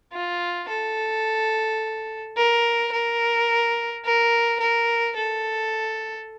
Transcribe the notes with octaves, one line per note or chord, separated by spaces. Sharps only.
F4
A4
A#4
A#4
A#4
A#4
A4